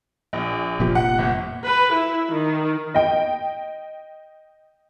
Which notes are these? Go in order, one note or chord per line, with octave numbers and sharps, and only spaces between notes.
A#1
F1 A#2 F3 G4
F#5
G1
B4
E4
D#3
D#5 G5